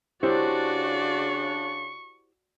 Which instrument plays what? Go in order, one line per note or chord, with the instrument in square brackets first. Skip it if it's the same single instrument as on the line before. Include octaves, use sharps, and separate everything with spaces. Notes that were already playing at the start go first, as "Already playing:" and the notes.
[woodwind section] C#3 D4 [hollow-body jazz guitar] E4 G4 C5 [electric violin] F#4 D5 [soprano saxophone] C#6